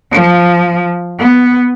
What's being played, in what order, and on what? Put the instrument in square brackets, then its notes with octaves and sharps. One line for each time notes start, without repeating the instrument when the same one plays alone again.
[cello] F3
B3